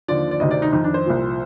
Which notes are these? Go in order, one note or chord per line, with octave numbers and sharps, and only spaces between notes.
D#2 D3 F3 D5
D5
D2 C3 D#3 D#5
D5
D#4
F2 D#3 D#4
D4
C5
C2 A#2 F3